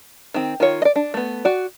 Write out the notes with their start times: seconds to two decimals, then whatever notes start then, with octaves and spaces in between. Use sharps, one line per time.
0.34 D#3 C4
0.60 D#3 F4 C#5
0.82 D5 D#5
0.96 D4
1.14 A3 B3
1.45 F#4 D5